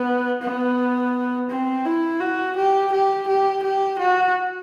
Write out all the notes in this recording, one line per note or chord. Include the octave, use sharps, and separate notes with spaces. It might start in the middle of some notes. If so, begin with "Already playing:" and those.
Already playing: B3
B3
C4
E4
F#4
G4
G4
G4
G4
F#4